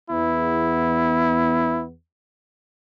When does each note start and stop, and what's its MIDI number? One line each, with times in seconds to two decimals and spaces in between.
0.10 1.92 40
0.10 1.92 59
0.10 1.84 64